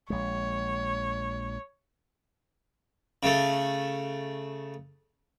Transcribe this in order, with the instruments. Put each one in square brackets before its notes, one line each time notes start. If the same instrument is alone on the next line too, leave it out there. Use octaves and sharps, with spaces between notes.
[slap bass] A#1 G#3 [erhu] C#5
[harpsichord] C#3 A3